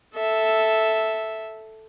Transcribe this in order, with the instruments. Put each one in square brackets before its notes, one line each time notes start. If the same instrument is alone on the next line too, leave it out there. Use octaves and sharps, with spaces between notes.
[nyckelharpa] A4 E5